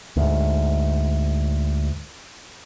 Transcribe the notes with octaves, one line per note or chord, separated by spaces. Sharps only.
D2 G#2